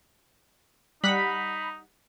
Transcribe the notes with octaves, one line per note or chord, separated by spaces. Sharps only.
G3 D#4 F#5 B5 B6